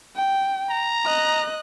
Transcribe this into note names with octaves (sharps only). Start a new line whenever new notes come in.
G5
A#5
D#5 F#6